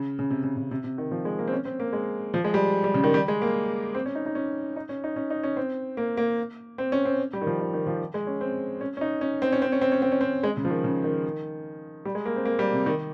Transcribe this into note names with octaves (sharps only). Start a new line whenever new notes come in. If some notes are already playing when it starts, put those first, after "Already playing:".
Already playing: C#3
C#3
C3
C#3
C#3
C3
C3
D#3
F3
G#3
A#3
C4
C#4
C4
A#3
G#3
F3
G#3
G3
G3
C#3
D#3
G3
G#3
A#3
C4
C#4
D#4
D#4
C#4
D#4
C#4
D#4
C#4
D#4
C#4
C4
A#3
A#3
C4
C#4
C4
G3
D#3
F3
D#3
D#3
F3
G#3
C#4
C4
C#4
C#4
D#4
C#4
C4
C#4
C4
C#4
C4
C#4
C4
C#4
C4
G#3
C#3
F3
D#3
C#3
D#3
G3
G#3
A#3
C4
A#3
G3
C3
D#3